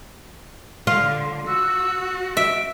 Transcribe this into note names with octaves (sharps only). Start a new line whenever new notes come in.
D3 F4
F#4 E6
E5 D7